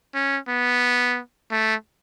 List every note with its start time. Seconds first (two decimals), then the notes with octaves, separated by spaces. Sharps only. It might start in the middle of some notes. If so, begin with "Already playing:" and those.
0.14 C#4
0.48 B3
1.51 A3